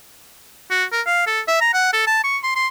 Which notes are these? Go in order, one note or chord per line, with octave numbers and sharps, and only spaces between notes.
F#4
A#4
F5
A4
E5
A#5
F#5
A4
A5
C#6
C6
C6